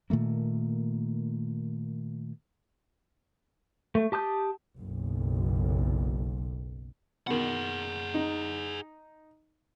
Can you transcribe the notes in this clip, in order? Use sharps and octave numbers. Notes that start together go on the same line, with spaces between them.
A#2 D#3 A3 A#3
A3
G4 A5 D#6 G6
F#1 B1
B2 D#3 G#4 F#5
D#4